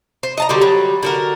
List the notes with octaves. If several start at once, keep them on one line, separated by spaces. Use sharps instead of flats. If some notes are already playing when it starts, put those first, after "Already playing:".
C5
D#5 A5 A#5
D3 G3 F#4 G4
F#3 G3
D3 F#4 A#4